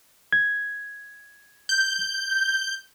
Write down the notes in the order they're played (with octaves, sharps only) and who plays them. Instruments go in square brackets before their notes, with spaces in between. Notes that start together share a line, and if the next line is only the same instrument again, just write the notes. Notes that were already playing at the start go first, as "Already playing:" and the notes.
[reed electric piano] G#6
[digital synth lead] G6